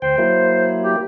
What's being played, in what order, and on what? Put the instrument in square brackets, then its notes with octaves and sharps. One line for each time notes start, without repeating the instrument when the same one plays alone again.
[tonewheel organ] D2 G5 [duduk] C5
[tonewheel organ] F#3 A#3 E4
[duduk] G4